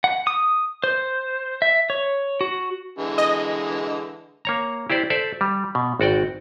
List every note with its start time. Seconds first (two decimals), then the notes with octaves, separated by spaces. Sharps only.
0.04 F#5
0.27 D#6
0.84 C5
1.62 E5
1.90 C#5
2.41 F#4
2.99 D3 E3 G#3
3.18 D#5
4.45 A#3 C#5 A#5
4.90 E4 G4 C5 D5
5.10 A4 C5 D5 E5
5.41 G3
5.75 B2
6.00 G#1 F#4 D5 G5